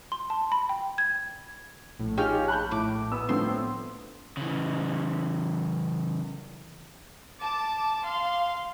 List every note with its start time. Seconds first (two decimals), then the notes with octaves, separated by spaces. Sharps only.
0.12 C6
0.30 A5
0.52 B5
0.69 G5
0.98 G#6
1.99 A#1 A2
2.18 C#4 D#4 F4 G4 G#4 F6
2.48 A5 B5 F#6 G6
2.71 A2 D6
3.12 B3 B5 D#6 E6
3.29 A2 F3 C4 D4 C6
4.37 C#3 E3
7.40 A5 D6
8.05 F5 C6